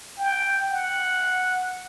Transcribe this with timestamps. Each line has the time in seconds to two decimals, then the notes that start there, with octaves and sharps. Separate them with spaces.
0.18 G5
0.73 F#5